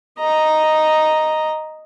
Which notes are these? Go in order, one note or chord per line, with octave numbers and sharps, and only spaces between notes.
D#5 A#5